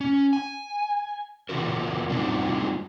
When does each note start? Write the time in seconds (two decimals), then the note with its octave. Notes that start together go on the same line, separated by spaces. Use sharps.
0.01 C#4
0.33 G#5
1.49 C#3 E3 F4 F#4 A#4
2.09 G3 C4 D4 D#4 F4 F#4